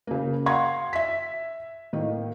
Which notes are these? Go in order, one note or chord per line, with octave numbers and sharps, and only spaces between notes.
C#3 A#3
F5 F#5 C6 G#6
E5 B6
A2 D#3 A#3